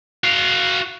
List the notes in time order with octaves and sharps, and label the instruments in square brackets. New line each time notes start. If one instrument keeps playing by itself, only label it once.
[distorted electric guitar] F#4 F5